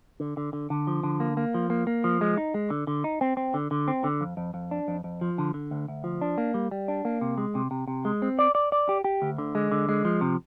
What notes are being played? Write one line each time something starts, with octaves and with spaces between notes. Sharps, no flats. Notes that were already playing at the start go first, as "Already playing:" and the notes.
D3
D3
D3
D3
F3
D3
A#3
A#3
F3
A#3
A#3
F3
G#3
D#4
G#3
D3
D3
D#4
C4
C4
D3
D3
C4
D3
F2
F2
F2
D4
F2
F2
F3
D3
D3
D2
D2
F3
D4
A#3
G3
G3
D4
A#3
C3
G#3
C3
C3
C3
G#3
C4
D5
D5
D5
G4
G4
D2
D3
G#3
D3
G#3
F3
C3